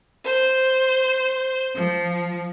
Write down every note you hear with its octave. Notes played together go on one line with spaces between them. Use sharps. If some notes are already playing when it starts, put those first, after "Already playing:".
C5
F3